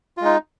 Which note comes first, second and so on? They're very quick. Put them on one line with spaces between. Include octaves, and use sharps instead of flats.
F4 G#3 D#4